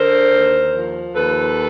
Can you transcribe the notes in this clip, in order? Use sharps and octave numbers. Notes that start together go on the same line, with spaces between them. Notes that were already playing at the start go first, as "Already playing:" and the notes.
Already playing: D3 A#4 C5
D#2
F3
D#2 A4 B4